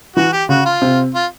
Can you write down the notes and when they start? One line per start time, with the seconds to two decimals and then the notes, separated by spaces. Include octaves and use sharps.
0.16 E3 F#4
0.33 G4
0.49 C#3 F#4
0.65 F4
0.82 C3
1.14 F4